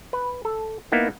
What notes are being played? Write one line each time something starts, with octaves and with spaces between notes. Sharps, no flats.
B4
A4
A#3 B3 D#4 E4